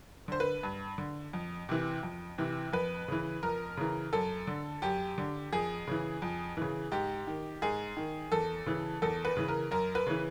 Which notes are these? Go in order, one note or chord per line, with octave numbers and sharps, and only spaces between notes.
D3 C5
B4
G2
D3
F2
C3 E3
F2
C3 E3
F2 B4
C#3 E3
F2 A#4
C#3 E3
F#2 A4
D3
F#2 G4
D3
F2 G#4
C#3 E3
F2
C#3 E3
G#2 G4
D#3
G#2 G#4
D#3
E2 A4
C#3 E3
E2 A4
B4
C#3 E3
A#4
F#2 A#4
B4
C#3 E3